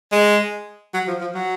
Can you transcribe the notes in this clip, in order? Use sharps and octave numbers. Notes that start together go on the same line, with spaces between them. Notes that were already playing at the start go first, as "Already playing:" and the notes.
G#3
F#3
F3
F3
F#3